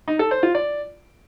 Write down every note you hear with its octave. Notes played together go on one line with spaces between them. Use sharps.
D#4
A4
C5
F4
D5